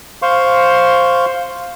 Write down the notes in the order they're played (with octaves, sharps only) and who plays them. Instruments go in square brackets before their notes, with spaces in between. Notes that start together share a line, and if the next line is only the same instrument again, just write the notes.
[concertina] C5 F5 C6 C#6